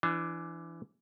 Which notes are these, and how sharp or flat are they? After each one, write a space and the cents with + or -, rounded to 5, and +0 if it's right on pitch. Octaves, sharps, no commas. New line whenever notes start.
E3 +25 D4 +5